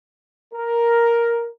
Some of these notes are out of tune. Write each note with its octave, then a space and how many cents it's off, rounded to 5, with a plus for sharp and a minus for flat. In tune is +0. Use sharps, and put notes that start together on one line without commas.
A#4 +5